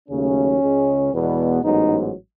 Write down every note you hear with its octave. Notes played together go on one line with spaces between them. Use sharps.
D#2 C#3 F#3 A3 C#4
C#2 C#3 G#3
E2 B2 G#3 B3
A1 G#2 F#3 B3 D#4